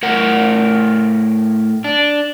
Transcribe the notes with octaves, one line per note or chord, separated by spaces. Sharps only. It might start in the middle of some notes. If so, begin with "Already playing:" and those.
A2 A#4 F#5
D4